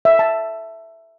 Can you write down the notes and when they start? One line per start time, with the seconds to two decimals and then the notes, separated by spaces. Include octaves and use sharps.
0.05 E5
0.19 A5